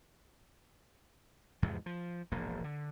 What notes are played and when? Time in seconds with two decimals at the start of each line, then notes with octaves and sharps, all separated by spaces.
1.62 E2 G#2 C3 F3
1.86 F3
2.32 E1 A#1 G#2 A#3
2.64 D3